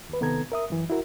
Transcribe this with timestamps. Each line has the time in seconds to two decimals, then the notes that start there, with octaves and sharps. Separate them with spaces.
0.09 D#2 B4
0.21 C3 D#3 B3 A4 A#5 G#6
0.52 A#4 E5 D#6
0.70 F#2 E3
0.90 E4 F#4 A#4